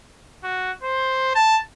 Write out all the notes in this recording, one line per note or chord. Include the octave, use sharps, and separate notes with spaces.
F#4
C5
A5